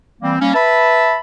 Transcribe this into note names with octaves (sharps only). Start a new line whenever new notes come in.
E3 G3 A#3 C4
G3 A#3 C#4
B4 E5 A5 B5